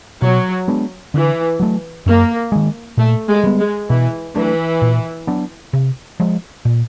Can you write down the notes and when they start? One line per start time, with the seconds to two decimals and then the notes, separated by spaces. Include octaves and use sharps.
0.22 B2 F#3
0.68 G#3 B3 D4
1.14 D3 E3
1.60 F#3 A3
2.06 F#2 A#3
2.52 D#3 G#3
2.98 A#2 A3
3.28 G#3
3.44 G3 B3
3.59 G#3
3.89 B2 E3
4.35 E3 F#3 A3 D4
4.82 A#2
5.27 F#3 B3 D4
5.73 C3
6.20 F3 G#3
6.65 A#2